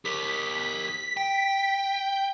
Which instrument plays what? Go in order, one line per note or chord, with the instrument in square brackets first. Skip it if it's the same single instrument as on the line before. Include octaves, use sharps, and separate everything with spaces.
[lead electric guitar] G4 A#4 [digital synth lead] B6
[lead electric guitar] G5